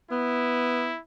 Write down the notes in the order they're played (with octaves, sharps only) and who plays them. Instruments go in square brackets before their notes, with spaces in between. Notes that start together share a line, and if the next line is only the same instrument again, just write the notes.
[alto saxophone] B3 [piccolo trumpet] E4